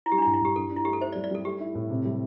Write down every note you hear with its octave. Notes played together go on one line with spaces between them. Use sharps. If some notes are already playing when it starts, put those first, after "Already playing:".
E4
G3 G4
D4
E4
G2
E4
G2 G4
D4 A4
D4
E4
A3 G4
A4
E4 C5
D5
G3
D5
G3 A4
A3 G4
E4
A2
C3
G3